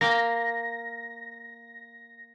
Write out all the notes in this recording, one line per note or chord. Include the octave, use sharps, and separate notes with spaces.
A#3 F5 G5 A#6